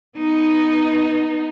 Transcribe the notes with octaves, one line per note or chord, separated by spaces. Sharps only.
B3 D#4